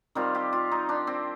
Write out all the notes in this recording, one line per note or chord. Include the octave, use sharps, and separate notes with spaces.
D#3 G3 C4 F4
G4
F4
D#4
D4
C4